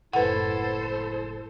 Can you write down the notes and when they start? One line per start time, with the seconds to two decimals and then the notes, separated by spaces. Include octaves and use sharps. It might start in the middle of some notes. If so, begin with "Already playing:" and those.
0.13 F#1 A2 E4 A4 B4 C5 F#5